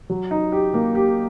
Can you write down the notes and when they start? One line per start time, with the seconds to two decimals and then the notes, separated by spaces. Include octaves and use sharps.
0.10 F#3
0.31 D#4
0.52 G4
0.74 A#3
0.95 G4